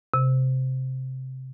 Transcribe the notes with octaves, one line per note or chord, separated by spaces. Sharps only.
C3